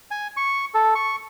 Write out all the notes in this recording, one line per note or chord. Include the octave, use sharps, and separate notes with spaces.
G#5
C#6
A4
C#6